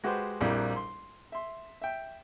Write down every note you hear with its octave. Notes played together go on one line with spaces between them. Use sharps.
G#3 F#4 G4 B4 C5
A#1 F2 G3 A#3 E4
C6
E5 C6
E5 G5